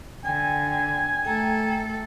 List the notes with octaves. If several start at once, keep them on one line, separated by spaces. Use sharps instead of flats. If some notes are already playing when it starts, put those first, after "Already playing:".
D3 G5 G#5
A3 A4 G5 A#5